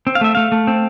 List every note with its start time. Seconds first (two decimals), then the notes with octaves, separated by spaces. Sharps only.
0.07 C4
0.15 F5
0.21 A3 E5
0.35 A3 F5
0.52 A3
0.67 C4